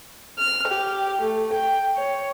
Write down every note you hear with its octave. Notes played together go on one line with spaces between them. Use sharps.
F6
G4
A3
G5
C#5